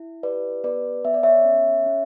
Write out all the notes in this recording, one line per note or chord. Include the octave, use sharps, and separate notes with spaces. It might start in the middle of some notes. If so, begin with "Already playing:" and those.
Already playing: E4
G4 B4 D5
B3 B4 D5
B3 E5
D5
C#5 E5
C#4
C#4